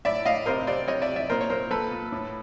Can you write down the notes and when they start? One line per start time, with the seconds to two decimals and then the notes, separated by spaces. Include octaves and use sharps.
0.05 A2 D5 E5
0.25 A2 D#5 F5
0.46 C3 A#4 C5
0.67 C3 C5 D5
0.88 C3 C#5 D#5
1.02 D5 E5
1.09 C3
1.16 D5 E5
1.30 A#2 A#4 C5
1.41 C#5
1.50 A#2 A#4 C5
1.70 A#2 A4 B4
1.91 A#2
2.12 A2